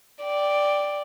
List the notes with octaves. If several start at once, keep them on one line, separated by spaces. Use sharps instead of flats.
D5 G5